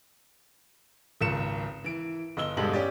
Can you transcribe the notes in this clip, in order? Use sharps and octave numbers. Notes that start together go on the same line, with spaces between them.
G#1 C#2 C#7 E7
E3 D7
G1 D#5 E6 G7
E1 G2 G#3 G4 A4 F#7
C#4 G4 D5